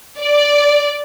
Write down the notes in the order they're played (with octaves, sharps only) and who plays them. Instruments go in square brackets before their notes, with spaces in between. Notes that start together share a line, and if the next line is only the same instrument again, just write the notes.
[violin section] D5